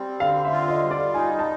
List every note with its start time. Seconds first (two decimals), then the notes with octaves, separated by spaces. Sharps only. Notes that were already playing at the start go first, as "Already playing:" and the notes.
Already playing: G3 C4
0.20 D3 F5
0.45 E5
0.52 F4
0.68 D#5
0.83 G3
0.91 D5
1.14 D#4 G#5
1.39 A5